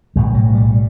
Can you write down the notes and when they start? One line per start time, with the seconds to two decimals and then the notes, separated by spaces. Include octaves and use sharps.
0.16 B1 A2 G3
0.35 F#3
0.55 G3